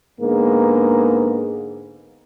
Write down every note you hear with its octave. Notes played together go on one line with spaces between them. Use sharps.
G#2 D3 A#3 B3